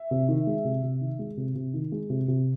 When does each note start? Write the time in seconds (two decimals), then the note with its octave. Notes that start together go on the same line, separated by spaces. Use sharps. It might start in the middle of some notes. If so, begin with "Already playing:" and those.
Already playing: E5
0.11 C3
0.28 D#3
0.47 G#3
0.65 C3
0.83 C3
1.01 D#3
1.19 G#3
1.37 C3
1.55 C3
1.74 D#3
1.92 G#3
2.10 C3
2.28 C3